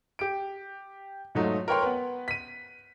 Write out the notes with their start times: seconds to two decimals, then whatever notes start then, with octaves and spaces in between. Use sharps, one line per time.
0.19 G4 D7
1.35 G#2 F#3 A3 D#4 F4
1.68 A#4 B4 C#5 G5 A#5 C6
1.82 B3 B4
2.28 B6 D#7